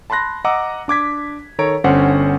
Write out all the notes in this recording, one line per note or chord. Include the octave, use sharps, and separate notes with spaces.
A5 B5 C6 F#6 A#6
D#5 F#5 A#5 D6 E6
D4 D6 G#6 B6
D#3 A4 C#5 A#5 D7
G1 D3 C#4 C5 F#5